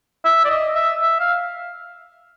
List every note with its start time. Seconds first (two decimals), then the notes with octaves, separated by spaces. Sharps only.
0.25 E5
0.45 D5
0.50 D#5
0.75 E5
1.02 E5
1.20 F5